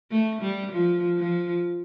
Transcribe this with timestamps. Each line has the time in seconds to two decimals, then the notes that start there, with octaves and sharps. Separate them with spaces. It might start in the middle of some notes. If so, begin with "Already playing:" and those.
0.11 A3
0.42 G3
0.73 F3
1.18 F3